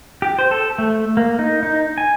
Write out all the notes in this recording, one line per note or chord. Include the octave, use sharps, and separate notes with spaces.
G4
C5
A4
A3
A#3
D#4
D#4
G#5